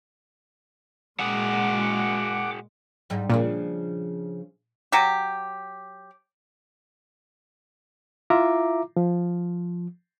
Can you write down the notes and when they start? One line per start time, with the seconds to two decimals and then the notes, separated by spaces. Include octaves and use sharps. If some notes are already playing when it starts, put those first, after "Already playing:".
1.20 A#2 G#3 F#4 G#4 F#5 D6
3.10 G#2 G3 D#4
3.30 A#2 C#3 F3 D4
4.92 F#3 G4
8.30 E4 F4 E5 A#5 D6
8.96 F3